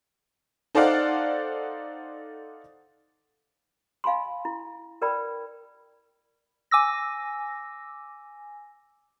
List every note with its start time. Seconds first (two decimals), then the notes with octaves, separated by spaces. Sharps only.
0.75 D#4 A4 C5 D5 F5 F#5
4.04 D#5 F5 G#5 B5 C6
4.45 E4
5.02 A#4 B4 D5 G5 B5
6.71 G#5 D6 E6 A#6